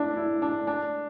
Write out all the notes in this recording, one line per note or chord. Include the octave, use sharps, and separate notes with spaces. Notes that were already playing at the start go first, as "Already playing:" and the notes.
Already playing: D4 E4
E4
D4
D4